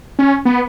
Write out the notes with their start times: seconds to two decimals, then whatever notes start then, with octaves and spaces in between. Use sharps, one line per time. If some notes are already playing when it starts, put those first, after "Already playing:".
0.19 C#4
0.45 B3